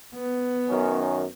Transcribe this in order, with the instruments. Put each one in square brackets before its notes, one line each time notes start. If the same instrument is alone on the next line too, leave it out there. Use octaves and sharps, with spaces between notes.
[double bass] B3
[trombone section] F#2 D#3 C#4